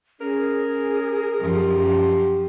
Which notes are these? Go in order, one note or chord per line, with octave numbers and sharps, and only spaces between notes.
C#4 G#4 A#4
F#2 F3 G4